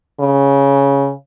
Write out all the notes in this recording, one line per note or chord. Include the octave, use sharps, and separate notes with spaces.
C#3